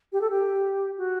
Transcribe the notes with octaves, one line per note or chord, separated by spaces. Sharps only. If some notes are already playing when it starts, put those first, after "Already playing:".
G4
A4
G4
F#4